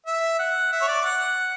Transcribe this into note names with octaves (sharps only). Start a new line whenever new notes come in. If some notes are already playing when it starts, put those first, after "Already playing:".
E5
F#5
E5
C#5
D5
F#5